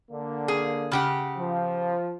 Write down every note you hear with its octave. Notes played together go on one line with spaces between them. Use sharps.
D3 A#3
G#4
C#3 G4 F#5
F3